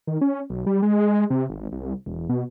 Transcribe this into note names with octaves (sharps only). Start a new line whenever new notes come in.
D#3
C#4
B1
G3
G#3
C3
G#1
C2
E1
B2